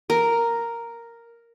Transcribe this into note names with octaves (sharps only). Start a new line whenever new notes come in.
A#4